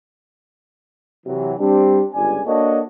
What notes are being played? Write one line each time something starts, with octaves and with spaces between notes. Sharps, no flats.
C3 E3 F#3
G3 C4 D4
G1 C#2 D5 G#5
A#3 D4 F#4 A4 C#5 D#5